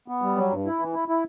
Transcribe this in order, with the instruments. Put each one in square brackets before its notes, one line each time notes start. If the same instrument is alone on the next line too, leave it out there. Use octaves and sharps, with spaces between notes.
[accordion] B3
G3
F#3
G2
E4
E3
E4
E4